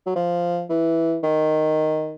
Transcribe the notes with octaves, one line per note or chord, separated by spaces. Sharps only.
F#3
F3
E3
D#3